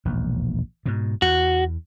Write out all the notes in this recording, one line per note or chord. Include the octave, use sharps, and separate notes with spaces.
E1 A#1 D#2
G#2 B2
E2 F#4